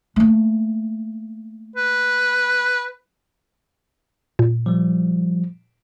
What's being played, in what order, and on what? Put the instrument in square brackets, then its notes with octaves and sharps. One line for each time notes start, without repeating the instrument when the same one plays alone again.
[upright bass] A3 A#3
[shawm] B4
[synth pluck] A#2
[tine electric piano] F3 G3